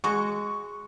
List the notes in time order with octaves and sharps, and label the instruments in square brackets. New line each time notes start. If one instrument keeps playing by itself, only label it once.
[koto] G#3 F#4 [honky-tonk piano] C#6